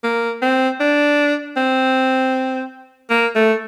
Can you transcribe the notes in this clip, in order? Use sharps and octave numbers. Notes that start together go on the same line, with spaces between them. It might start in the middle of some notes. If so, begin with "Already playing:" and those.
A#3
C4
D4
C4
A#3
A3